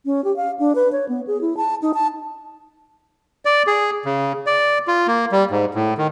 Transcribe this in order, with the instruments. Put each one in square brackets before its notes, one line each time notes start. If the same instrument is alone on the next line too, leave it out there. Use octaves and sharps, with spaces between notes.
[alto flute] C#4
G4
F5
D4
B4
C#5
B3
G#4
E4
A5
D#4
A5
[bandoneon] D5
G#4
C#3
D5
F4
A#3
G3
G#2
A2
D#3